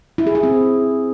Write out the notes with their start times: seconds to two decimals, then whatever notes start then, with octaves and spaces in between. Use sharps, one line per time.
0.18 E4
0.27 G#4
0.35 E4
0.43 C4